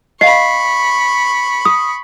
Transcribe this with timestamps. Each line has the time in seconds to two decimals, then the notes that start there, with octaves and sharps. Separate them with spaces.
0.21 D#5 F5 B5 C#6 C7
1.65 D#6